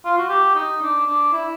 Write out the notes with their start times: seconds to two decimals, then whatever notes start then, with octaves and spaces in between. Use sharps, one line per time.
0.05 F4
0.18 F#4
0.29 G4
0.55 D#4
0.82 D4
1.06 D4
1.33 E4